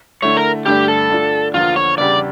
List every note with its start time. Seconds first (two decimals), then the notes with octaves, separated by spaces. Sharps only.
0.22 D3 A3 E4 C#5
0.37 A#4
0.66 G2 D3 A3 D4 G4
0.88 A4
1.10 D3 A3 D4 F4
1.54 E2 D3 F3 A#3 F4
1.76 C#5
1.98 E2 C#3 G3 D4 G4 D5